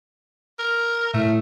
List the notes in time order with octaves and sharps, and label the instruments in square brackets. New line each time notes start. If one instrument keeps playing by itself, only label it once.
[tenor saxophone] A#4
[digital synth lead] A2 [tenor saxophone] A3